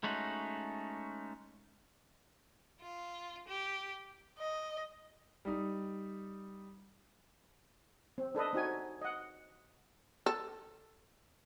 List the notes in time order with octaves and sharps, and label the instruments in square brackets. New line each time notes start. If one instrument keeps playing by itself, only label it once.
[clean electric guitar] G#3 A3 C#4 D#4 F#4
[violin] F4
G4
[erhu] D#5
[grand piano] G3 D#4
[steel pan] C4
D4 A4 B4 D#5
C4 D#4 F#4 G#5
D#5 F#5
[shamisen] A4